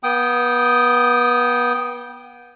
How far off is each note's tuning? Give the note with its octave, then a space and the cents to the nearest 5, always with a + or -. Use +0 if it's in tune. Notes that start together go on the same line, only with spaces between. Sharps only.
B3 -30 G5 -10 D#6 +0